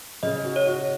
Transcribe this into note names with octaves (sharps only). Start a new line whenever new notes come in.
C#3 D#5
F#4
C#5
F#4